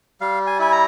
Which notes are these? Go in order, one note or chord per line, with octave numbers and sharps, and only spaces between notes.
G3 F5
G#5
E4 G#5
A#5